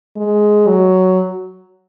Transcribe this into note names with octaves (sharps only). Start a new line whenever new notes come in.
G#3
F#3